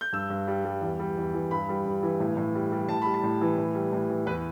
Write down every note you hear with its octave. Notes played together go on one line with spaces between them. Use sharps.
G6
G2 E6
G2
G3
G3
E2
G3
E2
E3
G2 B5
G3
G2
E3
A2
A2
G3
G3
A2 A5
G3 B5
A5
A2
E3
A2
G3
A2
E3
E2 B4